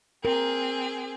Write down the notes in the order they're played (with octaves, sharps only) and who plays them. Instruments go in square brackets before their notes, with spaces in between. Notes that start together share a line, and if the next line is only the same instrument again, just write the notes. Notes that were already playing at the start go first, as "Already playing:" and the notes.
[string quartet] C4 G#4 [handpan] A#4